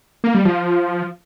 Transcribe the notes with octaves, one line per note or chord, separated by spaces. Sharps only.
A#3
G3
F3